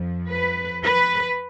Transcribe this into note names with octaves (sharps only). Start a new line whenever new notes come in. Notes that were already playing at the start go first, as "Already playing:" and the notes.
Already playing: F2 F3
B4
B4